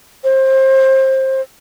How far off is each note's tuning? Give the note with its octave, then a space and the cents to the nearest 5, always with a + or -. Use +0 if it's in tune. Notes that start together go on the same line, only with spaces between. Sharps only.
C5 +25